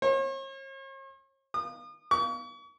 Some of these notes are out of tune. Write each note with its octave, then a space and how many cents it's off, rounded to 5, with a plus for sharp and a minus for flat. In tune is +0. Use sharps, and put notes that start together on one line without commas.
C#5 -45
D#6 -40
C#6 +40